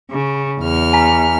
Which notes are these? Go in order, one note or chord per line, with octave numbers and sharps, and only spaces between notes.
C#3
E2 F6
G#5 A#5 B6